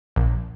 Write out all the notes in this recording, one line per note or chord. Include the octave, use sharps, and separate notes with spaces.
A#1